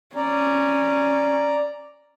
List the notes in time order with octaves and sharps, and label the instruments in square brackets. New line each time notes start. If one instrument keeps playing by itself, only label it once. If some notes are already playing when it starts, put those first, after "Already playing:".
[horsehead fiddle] C#4 [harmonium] D5 A#5